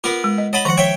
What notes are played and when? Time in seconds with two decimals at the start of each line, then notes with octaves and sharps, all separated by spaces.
0.04 B3 F4 A#4
0.24 G#3
0.38 D#5
0.53 C#5 D#5 F#5 A5 B5
0.65 D#3 F3 F#5 A#5 C#6
0.77 C#5 E5 G5